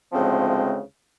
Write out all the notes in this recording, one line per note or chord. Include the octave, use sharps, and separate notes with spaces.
D2 A2 C#3 F3 G#3 C4